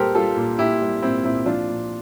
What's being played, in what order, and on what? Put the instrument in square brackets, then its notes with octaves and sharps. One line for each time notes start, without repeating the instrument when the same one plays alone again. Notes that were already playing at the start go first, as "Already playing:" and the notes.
Already playing: [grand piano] A#2 G3 G4 A4 A#4 C5
G3 F4 A4
A#2
A#2 E4 G4
G3
A#2 C4 E4
A#2 C4 E4
F3 D4 F4
A#2